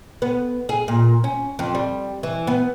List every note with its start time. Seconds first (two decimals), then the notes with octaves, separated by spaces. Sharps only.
0.22 B3
0.69 G#4
0.88 A#2
1.24 C#4
1.59 F2
1.75 G3
2.23 E3
2.47 B3